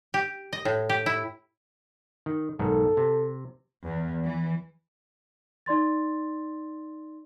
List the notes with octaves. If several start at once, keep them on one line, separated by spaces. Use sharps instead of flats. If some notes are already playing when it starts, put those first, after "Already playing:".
G4
D#5
A2
G4
E4
D#3
B1 G#2 D#3 A4
C3
E2
E3
D#4 D5 C6 A6